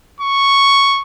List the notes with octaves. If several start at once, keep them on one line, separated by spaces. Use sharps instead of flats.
C#6